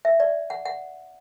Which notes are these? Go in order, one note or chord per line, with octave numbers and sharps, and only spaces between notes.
E5
D5
F#5
F#5